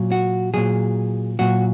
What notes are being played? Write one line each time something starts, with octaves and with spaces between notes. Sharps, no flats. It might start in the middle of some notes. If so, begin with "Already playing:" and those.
Already playing: A#2 F#3
F#4
A#2 F#3 G#4
A#2 F#3 F#4